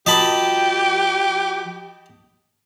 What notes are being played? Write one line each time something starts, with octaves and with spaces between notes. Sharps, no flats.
F3 F#4 G4 A#4 D#5 A5 B5